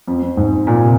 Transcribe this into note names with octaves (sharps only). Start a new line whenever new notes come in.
F2
F2
G#2
A#2
C3